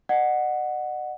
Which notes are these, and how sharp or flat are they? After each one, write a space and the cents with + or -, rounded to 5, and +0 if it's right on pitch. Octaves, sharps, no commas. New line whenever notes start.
D#5 -45 F#5 +0